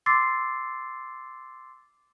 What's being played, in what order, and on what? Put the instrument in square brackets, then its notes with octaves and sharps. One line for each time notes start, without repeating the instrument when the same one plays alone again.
[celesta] C6 D6 E6 A6 C7